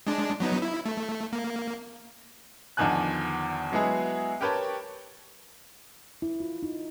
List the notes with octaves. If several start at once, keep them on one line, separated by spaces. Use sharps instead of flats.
G#3 D4
F#3 B3 D#4
E4
A3
A#3
E2 D3 D#3 F3 G#5 F#6
F#3 G#3 B3 E4 F#4 G#4
G4 A#4 B4 C#5 G5 A5
E4
F4
D#4